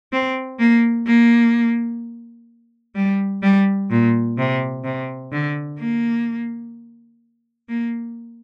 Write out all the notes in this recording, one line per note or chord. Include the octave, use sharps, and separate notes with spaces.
C4
A#3
A#3
G3
G3
A#2
C3
C3
D3
A#3
A#3